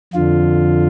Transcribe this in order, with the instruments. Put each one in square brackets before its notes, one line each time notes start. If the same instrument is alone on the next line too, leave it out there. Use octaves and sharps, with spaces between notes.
[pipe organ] F2 D3 F4